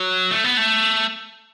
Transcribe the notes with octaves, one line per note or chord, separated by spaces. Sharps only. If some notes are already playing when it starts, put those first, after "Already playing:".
Already playing: F#3
A3
B3
A3